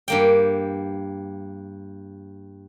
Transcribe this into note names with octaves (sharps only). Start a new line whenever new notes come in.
G2 A#3 G5